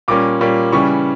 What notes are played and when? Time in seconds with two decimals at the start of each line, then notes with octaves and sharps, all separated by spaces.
0.08 A#2 G3 A#3 C#4 D6
0.40 A#2 G3 A#3 C#4
0.72 C#3 E3 G3 C#4 C#6